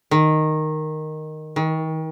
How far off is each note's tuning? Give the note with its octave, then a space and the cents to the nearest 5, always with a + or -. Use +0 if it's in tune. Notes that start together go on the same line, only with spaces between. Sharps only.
D#3 -5
D#3 +35